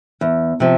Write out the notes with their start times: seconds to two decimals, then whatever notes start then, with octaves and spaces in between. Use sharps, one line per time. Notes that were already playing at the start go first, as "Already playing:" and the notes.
0.21 E2
0.60 C3 F3